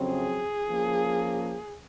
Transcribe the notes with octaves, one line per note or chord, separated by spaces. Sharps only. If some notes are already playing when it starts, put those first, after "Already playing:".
Already playing: F2 C#3 F#3 C4
G#4
F3 A#3 C#4